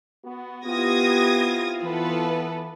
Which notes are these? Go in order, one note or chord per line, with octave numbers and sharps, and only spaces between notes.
B3 F#4
B3 C4 E4 F4 G4 D#6 G#6 A#6
E3 B3 A4 B4